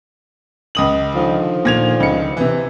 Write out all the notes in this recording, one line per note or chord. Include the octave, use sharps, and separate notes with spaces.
C#2 D#6 F#7
D3 D#3 F3
A#2 G#6 F7
C#2 C#7
C3 E3